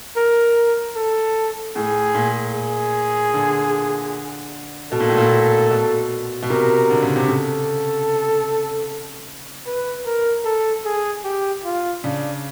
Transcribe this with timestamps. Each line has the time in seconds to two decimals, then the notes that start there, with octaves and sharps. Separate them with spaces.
0.17 A#4
0.96 A4
1.76 A2 G#4
2.15 A#2
2.55 G#4
3.34 D3
4.92 B2 A4
5.00 A#2
5.09 A2
5.17 A#2
5.71 B2
6.42 B2
6.50 C3 A#4
6.90 D3
7.03 C#3
7.16 C3
7.28 C#3 A4
9.67 B4
10.06 A#4
10.45 A4
10.86 G#4
11.25 G4
11.65 F4
12.04 C#3 D4